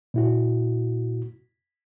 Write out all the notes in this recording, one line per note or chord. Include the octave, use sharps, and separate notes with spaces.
A#2 E4 F#4